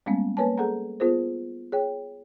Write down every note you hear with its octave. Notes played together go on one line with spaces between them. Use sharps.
G3 G#3 A#3 B3 C#4
A#3 A#4 B4 C#5 G#5 A5
G#4 A4 F#5 A#5
B3 F4 G#4 A#4 C5
G#4 C#5 G5